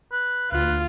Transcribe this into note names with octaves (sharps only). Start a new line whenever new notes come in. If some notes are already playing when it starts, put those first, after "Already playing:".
B4
D2 F4 B4